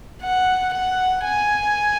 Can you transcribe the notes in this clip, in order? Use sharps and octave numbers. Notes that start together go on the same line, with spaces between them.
F#5
F#5
G#5